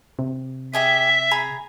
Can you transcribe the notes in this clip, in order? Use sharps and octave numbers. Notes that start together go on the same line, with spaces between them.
C3
G4 G#4 D#5 E5
G#4 A#5 B5